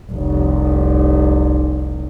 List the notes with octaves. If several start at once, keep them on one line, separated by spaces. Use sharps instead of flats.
F1 C2